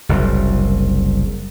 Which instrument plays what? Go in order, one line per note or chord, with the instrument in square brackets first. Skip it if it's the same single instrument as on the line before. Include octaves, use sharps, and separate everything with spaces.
[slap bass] F#1 C2